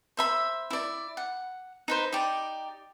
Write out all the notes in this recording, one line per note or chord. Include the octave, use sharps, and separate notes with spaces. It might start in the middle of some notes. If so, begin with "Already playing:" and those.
C5 E5 B5
E4 D5
F#5
D#4 B4 C5
D#4 G4 D5